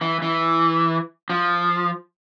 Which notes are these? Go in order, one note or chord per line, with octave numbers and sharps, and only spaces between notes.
E3
E3
F3